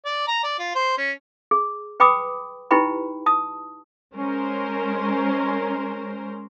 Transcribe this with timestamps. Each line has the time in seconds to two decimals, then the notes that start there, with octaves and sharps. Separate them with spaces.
0.05 D5
0.28 A#5
0.44 D5
0.59 F4
0.75 C5
0.98 C#4
1.51 G#4
2.00 B4 G5 B5 D6 D#6
2.71 D#4 E4 G4 B4 G5 B5
3.26 A5 D#6
4.15 G#3 C#4 A#4 C5